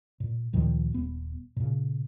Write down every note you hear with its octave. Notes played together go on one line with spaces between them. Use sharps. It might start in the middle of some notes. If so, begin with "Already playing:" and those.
A#2
D2 A#2 D#3 F3
D#1 B3
A#2 C#3